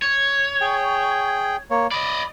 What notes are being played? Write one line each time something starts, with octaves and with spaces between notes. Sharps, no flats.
C#5
G#4 G5
A#3 C#5
D5 D#5 B5